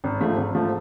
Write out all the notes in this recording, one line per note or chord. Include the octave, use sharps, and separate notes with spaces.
G#1
G#2 F3 A3
G#1
G#2 F3 A3